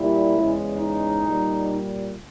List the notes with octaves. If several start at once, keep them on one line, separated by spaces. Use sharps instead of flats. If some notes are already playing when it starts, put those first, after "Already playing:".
Already playing: A#2 G3 E4
E2 C#3 G#3
D#4
A#2 G3